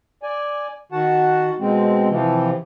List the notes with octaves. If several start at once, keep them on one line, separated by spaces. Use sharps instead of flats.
D5 G#5
D#3 F#4 F#5 A5
B2 G#3 C4
C3 E3 F3